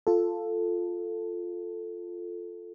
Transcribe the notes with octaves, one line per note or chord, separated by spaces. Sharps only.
F4 A4